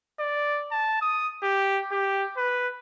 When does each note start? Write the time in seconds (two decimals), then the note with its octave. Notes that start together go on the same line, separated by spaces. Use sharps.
0.20 D5
0.71 A5
1.01 D#6
1.43 G4
1.91 G4
2.37 B4